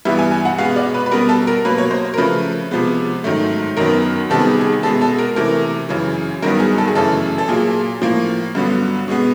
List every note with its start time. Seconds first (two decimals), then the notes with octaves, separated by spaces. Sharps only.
0.05 G2 E3 G3 B3 E5
0.19 G#5
0.32 G#5
0.45 F#5
0.58 B2 G#3 B3 F5
0.76 D5
0.94 B4
1.06 B4
1.11 B2 G3 B3 A#4
1.29 A4
1.47 A#4
1.65 B2 F#3 A#3 B4
1.78 C#5
1.91 C5
2.14 A#4
2.18 C#3 F3 A3 B4
2.71 C3 F3 G#3 B3
3.24 G#2 D#3 F#3 A3
3.77 F#2 D#3 F#3 B3 A#4
4.30 C3 D#3 G3 B3 A4
4.41 G#4
4.61 G#4
4.83 B2 G#3 B3 A4
5.01 A4
5.19 A#4
5.36 C3 E3 A3 A#4
5.89 F#2 C#3 E3
6.43 G2 D#3 F#3 B3 A#4
6.60 G#4
6.78 A4
6.88 G#4
6.95 F#2 C#3 E3 A3 A4
7.38 A4
7.48 A#2 F#3 A#3 G#4
8.02 A2 F3 A#3
8.55 G2 D3 F#3 B3
9.08 B2 G#3 B3